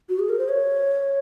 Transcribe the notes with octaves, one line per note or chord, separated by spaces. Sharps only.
F#4
G#4
A#4
C5
C#5